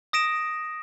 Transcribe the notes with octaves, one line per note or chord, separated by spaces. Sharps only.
D#6 A#6 D7 E7